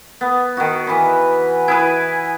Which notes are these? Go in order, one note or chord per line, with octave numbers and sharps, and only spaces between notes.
B3
D#3 F#4
E3 B5
E4 G#4 B4